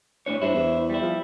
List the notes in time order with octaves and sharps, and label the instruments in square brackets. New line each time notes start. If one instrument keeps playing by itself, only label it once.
[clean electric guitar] A2 D4 C#5
[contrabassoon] G2 [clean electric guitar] E4 C5
[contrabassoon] E2
[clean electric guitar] G3 E4
[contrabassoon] F3